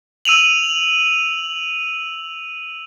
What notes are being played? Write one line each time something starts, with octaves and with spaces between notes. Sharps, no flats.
E6 D#7 F7 F#7